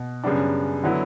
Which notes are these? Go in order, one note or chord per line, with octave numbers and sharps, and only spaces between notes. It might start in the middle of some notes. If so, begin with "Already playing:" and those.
Already playing: B2
F#2 C#3 G3 B3 D4
D3 F#3 B3 E4